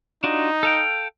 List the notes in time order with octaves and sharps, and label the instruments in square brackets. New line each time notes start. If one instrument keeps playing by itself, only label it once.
[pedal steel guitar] D4 F4 F#4 [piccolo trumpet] D#4
[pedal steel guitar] A4 F5 G5